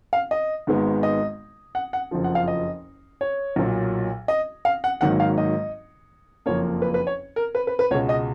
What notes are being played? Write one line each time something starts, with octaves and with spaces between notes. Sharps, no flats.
F5
D#5
G#1 G#2 D#3 G#3 B3
D#5
F#5
F#5
F#1 F2 F3
F#5
F5
D#5
C#5
B1 A#2 F#3
D#5
F5
F#5
G#1 G#2 D#3 F#3 A#3 F#5
F5
D#5
F#1 F2 F3 A#3 C#5
B4
B4
C#5
A#4
B4
B4
B4
C#2 B2 G#3 C#5
D#5